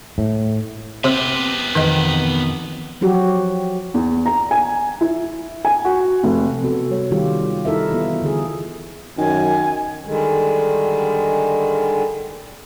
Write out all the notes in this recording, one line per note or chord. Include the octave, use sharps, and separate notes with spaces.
A2
C3 B3 G4
F2 B2 D#3 E3 B4 D#5
F3 F#3 F#4 G4
E2
A#5
G#5
E4
G#5
F#4
F1
C3 B3 F#4 A4
G3 C#5
D#3 G3 F4 G4
D#4 E4 A4 A#4 E5
E3 B3 F4
D3 G#4
F#2 D#3 G#5
D3 D#3 G3 G#3